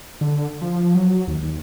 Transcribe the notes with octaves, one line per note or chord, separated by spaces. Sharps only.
D3
F3
F#3
D#2
D#2